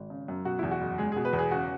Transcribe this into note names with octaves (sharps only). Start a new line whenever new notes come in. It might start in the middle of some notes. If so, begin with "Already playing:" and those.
Already playing: G#1
C#3
F#2
B2 F#4
E2 E4
F#4
F#1
G#3 G#4
B2 G#4
B4
E2
G#4
C#3 F#4